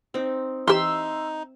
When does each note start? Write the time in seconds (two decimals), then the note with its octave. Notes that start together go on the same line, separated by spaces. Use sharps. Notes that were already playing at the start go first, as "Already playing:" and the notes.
0.14 C4 D#4
0.68 E3 D#4 G4 E5 C6 E6